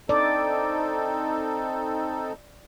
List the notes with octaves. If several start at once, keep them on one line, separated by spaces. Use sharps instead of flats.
C4 D#4 A4 D5